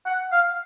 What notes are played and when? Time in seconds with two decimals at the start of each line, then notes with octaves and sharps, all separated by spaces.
0.06 F#5
0.32 F5